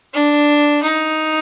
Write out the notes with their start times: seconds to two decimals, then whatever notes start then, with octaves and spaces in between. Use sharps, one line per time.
0.13 D4
0.83 D#4